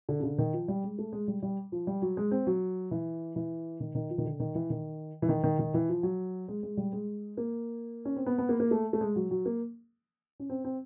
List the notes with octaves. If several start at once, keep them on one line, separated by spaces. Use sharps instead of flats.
D3
C#3
D3
D#3
F3
G3
G#3
A3
G#3
G3
G3
F3
G3
F#3
G#3
C4
F#3
E3
E3
D#3
D#3
F3
D#3
D3
D#3
E3
D#3
E3
D#3
D#3
D#3
E3
F3
F#3
G#3
G#3
G3
G#3
A#3
C#4
C4
B3
B3
A#3
A#3
A3
A3
G#3
F#3
F#3
A#3
C#4
C4
C4